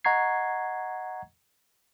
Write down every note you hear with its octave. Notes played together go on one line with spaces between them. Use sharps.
D#5 F#5 A#5 C#6 G#6 C7